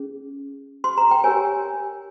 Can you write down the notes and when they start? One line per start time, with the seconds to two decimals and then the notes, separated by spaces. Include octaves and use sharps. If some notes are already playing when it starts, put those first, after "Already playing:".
Already playing: C#4 G#4
0.84 C6
0.98 A#5
1.11 G5
1.24 G4 A#4 C#5 G#5